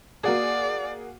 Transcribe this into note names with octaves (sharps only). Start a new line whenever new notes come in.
A#3 F#4 G#4 D5